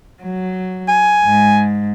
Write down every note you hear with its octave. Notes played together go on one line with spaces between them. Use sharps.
F#3
G#5
G#2